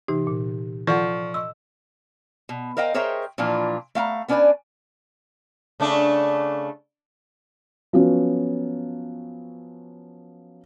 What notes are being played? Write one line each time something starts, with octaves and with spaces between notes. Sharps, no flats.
C3 E3 D#4 G4
A#2
F3 A4 D5 F#5 C#6
D#5 C6 C#6 E6
B2
A#4 C5 D#5 F5 G5
G#4 A#4 C5 C#5 E5 G5
A#2 E3 F3 D4 F4
A3 F5 G5 A#5
B3 C#4 D4 B4 D5 G#5
C#3 A3 D4
F3 F#3 B3 C#4